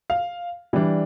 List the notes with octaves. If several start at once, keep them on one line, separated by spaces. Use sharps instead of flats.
F5
E3 G3 D4